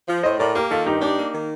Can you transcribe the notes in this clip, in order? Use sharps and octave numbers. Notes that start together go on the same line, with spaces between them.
F3
A2 C5 D#5
A2 A#4 D5
A#3 G4 A#4
D#3 F4 A4
G2 D#4 G4
D4 D#4 G4
A#3
D#3